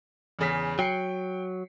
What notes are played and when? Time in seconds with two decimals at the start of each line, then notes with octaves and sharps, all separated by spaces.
0.39 E2 C#3 B6
0.79 F#3 G5 C7 C#7